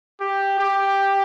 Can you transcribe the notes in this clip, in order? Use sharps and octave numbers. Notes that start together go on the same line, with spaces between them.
G4
G4